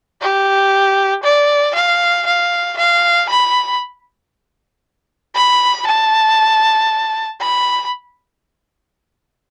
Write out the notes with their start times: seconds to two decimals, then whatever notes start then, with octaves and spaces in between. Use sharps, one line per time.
0.21 G4
1.24 D5
1.75 F5
2.27 F5
2.78 F5
3.29 B5
5.35 B5
5.86 A5
7.41 B5